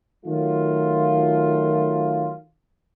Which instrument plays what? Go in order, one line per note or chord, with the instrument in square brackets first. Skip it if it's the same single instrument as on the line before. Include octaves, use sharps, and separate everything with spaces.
[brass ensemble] D#3 F#3 A3 F4